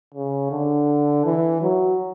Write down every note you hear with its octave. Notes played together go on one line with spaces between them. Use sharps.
C#3
D3
E3
F#3